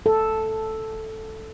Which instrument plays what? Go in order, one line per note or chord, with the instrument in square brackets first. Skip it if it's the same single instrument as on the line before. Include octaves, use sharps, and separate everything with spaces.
[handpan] A4